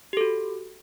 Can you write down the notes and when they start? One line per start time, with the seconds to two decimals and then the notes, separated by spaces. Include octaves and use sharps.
0.13 G4
0.17 A4
0.21 F#4